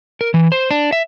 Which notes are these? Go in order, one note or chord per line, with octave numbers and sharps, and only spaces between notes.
A#4
E3
C5
D4
E5